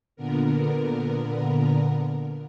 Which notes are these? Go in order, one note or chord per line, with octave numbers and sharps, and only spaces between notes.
A#2 D3 B3 A#4